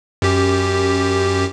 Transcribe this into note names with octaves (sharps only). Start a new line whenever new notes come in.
F#2 G4